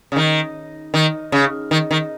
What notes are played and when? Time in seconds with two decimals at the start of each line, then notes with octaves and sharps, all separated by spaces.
0.12 C#3
0.16 D#3
0.94 D#3
1.32 C#3
1.71 D#3
1.91 D#3